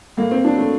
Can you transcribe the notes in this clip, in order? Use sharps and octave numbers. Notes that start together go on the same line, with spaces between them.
A2 A#3
C4
F#3 D4
A3